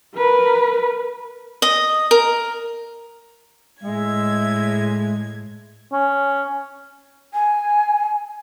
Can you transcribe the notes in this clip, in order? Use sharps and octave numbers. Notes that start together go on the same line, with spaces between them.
A#4 B4
D#5
A#4
A2 G#3 E5 G#6
C#4
G#5